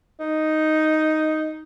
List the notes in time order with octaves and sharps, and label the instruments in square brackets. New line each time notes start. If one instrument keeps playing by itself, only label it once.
[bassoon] D#4